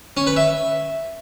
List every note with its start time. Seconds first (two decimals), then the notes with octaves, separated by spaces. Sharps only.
0.17 C#4
0.27 B4
0.36 E5